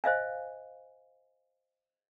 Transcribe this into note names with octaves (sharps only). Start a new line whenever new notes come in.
C5 D#5 F5 G#5